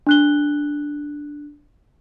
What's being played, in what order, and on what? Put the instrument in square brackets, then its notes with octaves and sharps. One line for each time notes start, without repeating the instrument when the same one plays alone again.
[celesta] D4 F#6 G7